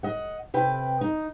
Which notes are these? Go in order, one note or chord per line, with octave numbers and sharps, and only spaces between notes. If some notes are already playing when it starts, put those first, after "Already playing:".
D#5 F#5
C3 B4 G5
D#4